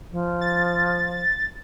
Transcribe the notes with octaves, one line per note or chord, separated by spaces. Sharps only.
F3
A6